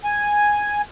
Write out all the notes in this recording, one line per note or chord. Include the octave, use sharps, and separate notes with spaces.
G#5